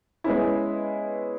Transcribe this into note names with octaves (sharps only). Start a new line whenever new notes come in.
G#3 B3 C#4 E4